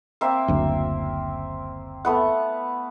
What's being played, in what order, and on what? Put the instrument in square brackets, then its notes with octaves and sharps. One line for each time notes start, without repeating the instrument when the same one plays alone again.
[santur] A#3 C4 E5
[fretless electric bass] F#1 D2
[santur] A3 B3 F#5